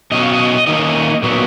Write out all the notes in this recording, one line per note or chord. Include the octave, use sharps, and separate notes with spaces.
B2 F#3 C#4 D#5
F5
D#5
D#3 A#3 C#4 D#5
A#2 F#3 B3